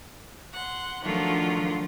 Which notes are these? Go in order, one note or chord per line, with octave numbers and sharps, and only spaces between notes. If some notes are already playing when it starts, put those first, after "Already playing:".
F#5 C6
D#3 F3 F#3 A3 D4 F4